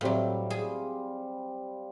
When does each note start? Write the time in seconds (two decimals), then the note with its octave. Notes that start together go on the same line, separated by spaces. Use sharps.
0.01 A2 F#3 G3 C4 F5
0.50 G#4